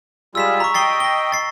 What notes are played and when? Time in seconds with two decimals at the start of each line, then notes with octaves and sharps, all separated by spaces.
0.35 G3 G#3 F4 E6 B6 E7
0.60 A#5 C#6
0.74 D#5 G5 A6 C7 G7
1.00 A#6 G7
1.32 A6 C7